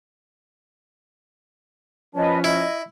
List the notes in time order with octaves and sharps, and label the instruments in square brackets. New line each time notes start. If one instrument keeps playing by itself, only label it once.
[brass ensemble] F3 C#4 [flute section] B4 D#5 A5
[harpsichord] E4 [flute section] D#5